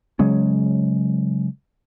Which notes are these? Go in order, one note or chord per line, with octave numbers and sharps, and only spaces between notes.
C#3 F#3 G#3 C#4